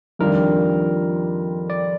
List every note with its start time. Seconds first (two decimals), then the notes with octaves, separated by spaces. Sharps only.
0.19 F2 D#3 G3 D4 F4 A#4
1.70 D5